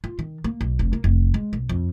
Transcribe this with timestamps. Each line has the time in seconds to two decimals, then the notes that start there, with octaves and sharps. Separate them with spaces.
0.04 F4
0.19 D#3
0.44 A#3
0.61 B1
0.79 F1
0.93 A#3
1.04 F1
1.34 G#3
1.53 B1
1.69 F2